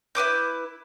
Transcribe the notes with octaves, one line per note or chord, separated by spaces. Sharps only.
E4 B4 D6 G6